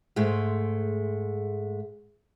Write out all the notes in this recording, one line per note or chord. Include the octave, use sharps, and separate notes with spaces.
G#2 G#3 A3